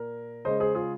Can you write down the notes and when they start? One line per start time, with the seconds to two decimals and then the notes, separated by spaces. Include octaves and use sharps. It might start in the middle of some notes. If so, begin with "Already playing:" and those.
Already playing: A#2 A#4
0.45 C#3 G#3 C5 D#5
0.60 G#4 C5
0.75 F4 G#4